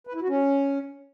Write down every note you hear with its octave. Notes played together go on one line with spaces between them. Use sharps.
B4
E4
F#4
C#4